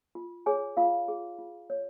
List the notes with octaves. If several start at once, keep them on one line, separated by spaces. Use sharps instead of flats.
F4
G#4 C#5 G#5
F4 F5
G#4
F4
C#5